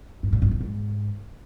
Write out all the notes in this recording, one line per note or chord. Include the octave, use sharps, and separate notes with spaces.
G#2
A#2
G#2
A#2
G#2